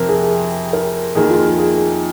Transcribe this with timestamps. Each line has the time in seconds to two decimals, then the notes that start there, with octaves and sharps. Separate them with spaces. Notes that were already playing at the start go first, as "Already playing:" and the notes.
Already playing: F2 C3 F3 C4 A#4
0.08 G#4
0.73 A#4
1.15 F2 D#3 A#3 G#4
1.30 F4
1.45 G#4
1.59 G#4